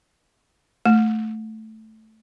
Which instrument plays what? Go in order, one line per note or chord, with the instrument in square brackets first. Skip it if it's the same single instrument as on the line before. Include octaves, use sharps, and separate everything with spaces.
[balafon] A3